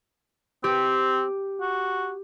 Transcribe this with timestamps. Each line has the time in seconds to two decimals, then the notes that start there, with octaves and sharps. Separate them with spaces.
0.64 C4 G4
1.61 F#4